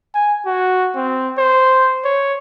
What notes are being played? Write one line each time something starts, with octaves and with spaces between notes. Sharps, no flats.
G#5
F#4
C4
C5
C#5